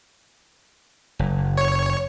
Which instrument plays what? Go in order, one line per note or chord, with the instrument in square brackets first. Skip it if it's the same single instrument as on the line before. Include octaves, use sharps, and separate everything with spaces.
[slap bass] F#1
[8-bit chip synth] C#5